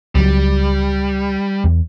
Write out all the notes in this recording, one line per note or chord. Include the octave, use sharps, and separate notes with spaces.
C#2 F#3 G3
E2